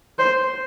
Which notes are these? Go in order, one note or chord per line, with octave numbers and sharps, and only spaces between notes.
C5